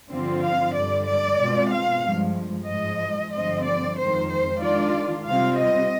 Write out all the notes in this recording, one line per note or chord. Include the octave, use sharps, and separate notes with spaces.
G2 D3 F3 C4 F4
F5
G2 D3 G3 D5
D5
B2 G#3 C4 F4
F5
G2 F3 G#3
G#2 F3 G#3 D#5
G2 D3 F3 C4 D#5
D5
F2 D#3 G#3 C5
C5
D#3 G#3 D4 F4 D5
C3 G3 C4 F4 F5
D#5